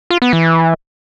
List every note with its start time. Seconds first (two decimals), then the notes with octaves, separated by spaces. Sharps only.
0.10 F4
0.22 B3
0.33 E3